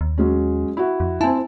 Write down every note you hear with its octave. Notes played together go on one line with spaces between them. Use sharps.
D#2
F#3 G#3 C#4
E4 F#4
F2
C4 E4 G#5 A5